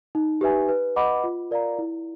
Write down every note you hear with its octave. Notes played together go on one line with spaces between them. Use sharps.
D#4
G4 B4 E5 G#5
B4
D#5 F#5 B5 D6
F4
A#4 D5 F5 A#5
E4